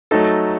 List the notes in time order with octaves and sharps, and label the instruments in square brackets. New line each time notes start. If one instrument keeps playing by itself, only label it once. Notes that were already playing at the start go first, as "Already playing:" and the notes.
[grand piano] F#3 A3 D#4 A4